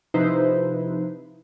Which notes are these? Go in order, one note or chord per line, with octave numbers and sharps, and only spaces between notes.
C3 F3 D#4 E4 B4 C5